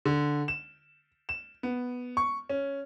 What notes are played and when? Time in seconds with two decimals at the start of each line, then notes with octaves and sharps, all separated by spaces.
0.05 D3
0.48 E7
1.29 E7
1.63 B3
2.17 C#6
2.49 C#4